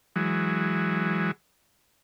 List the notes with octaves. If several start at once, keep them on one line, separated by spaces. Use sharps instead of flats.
E3 F#3 G#3